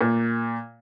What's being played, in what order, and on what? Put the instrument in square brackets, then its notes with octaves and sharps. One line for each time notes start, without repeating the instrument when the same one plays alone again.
[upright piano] A#2